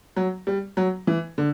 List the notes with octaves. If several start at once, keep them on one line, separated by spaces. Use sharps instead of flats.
F#3
G3
F#3
E3
D3